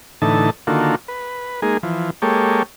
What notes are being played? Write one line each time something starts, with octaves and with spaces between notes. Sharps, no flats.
A2 D3 E3 D#4 A5
D3 D#3 A#3 F4 F#4 A4
B4
G#3 A#3 D#4 G#4
E3 F3
G#3 A#3 G4 A4 C#5